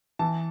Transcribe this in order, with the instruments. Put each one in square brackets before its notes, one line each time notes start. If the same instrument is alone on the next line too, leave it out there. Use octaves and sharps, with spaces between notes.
[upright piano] E3 A5